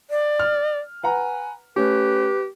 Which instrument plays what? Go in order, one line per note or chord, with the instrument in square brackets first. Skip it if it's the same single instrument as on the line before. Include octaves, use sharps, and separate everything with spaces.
[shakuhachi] D5
[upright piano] F6
[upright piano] B4 F#5 A#5 [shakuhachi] G#5
[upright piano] A3 C#4 [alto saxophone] G4 [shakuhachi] B4